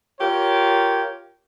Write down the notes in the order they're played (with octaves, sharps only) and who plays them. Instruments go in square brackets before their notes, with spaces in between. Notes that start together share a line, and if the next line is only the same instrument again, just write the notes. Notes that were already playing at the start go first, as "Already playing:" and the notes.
[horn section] F4 G4 A#4 C#5